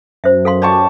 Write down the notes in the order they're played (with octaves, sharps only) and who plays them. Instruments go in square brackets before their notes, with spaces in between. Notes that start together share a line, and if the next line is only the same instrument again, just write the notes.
[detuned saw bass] F#2 [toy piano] C5 E5
[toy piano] A4 F5 C6
[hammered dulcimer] G4 A5 C#6 [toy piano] D5